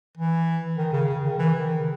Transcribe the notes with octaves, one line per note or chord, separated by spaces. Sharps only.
E3
D#3
C#3
C#3
D#3
E3
D#3
C#3